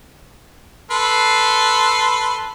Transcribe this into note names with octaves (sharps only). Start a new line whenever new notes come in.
A4 B4 C6